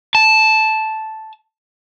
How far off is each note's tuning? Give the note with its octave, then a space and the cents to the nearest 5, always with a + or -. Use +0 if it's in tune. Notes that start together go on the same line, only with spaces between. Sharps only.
A5 -5